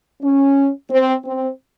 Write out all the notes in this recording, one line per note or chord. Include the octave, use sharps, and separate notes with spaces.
C#4
C4
C4